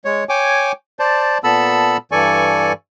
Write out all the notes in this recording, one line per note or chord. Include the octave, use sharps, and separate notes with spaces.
G#3 C#5
C#5 G5 G#5 D6
C5 D5 A5
A#2 B3 A4 A5 B5 E6
G2 E3 A4 D5 G#5 C#6